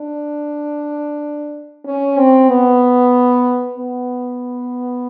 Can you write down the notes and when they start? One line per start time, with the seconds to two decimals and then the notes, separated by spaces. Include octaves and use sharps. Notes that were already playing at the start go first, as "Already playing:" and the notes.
Already playing: D4
1.86 C#4
2.18 C4
2.49 B3
3.78 B3